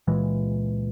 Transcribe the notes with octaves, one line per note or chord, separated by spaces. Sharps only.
C#2 A#2 E3 G#3